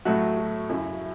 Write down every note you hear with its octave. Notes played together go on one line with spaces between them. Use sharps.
A2 F#3 A3 F#4
F#4
F#2 C#3 F#3 E4